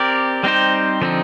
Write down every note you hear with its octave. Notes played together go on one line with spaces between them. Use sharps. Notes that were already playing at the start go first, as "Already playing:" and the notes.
Already playing: C4 G4 A#4 D5
G3 C4 D#4 G4 C5
D3 F3 C4 D#4